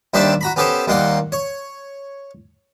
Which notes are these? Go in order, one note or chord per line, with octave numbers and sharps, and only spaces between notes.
D#2 G3 D4 C5 E5 A5
F#4 A#5 B5
B3 C#4 G4 A4 C5
D#2 G3 A#3 F#5 C6
C#5